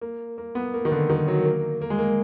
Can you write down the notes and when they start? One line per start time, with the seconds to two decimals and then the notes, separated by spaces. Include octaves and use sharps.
0.01 A#3
0.38 A#3
0.55 B3
0.74 A#3
0.85 D#3
0.92 D3
1.10 D#3
1.28 F#3
1.45 A#3
1.81 A#3
1.90 G#3
1.99 A#3